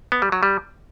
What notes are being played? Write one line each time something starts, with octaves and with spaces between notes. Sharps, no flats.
B3
G3
F#3
G3